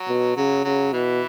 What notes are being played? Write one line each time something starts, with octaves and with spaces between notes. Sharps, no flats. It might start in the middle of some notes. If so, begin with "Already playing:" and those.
Already playing: F#3
B2
C#3 F#3
C#3 F#3
B2 E3